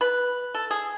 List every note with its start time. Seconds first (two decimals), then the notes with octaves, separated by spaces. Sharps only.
0.01 B4
0.55 A4
0.71 G#4